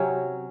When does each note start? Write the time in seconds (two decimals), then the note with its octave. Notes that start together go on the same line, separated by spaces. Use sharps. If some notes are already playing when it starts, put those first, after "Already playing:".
Already playing: C3 F#3 C#4